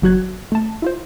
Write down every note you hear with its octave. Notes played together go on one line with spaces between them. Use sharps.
G1 F#3 F#4 F#6 G#6
A3 A5
E4 F4 C5